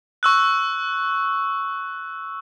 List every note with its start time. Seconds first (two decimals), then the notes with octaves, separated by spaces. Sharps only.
0.23 C#6 E6 F#6